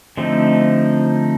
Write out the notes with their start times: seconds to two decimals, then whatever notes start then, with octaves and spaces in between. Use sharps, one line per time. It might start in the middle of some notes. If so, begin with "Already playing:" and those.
0.17 D3 F3 A3 C4 D#4